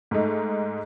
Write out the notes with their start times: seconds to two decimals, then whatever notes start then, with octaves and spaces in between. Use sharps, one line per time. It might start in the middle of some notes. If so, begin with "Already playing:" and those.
0.11 G#2 A3 D#4